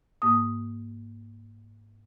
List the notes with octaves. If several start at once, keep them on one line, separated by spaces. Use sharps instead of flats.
G#2 A#3 D#6